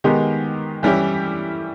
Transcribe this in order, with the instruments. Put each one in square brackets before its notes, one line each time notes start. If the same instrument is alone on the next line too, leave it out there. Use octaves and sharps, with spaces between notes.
[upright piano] D#3 G#3 B3 D#4 G4
E3 G3 C#4 E4 G4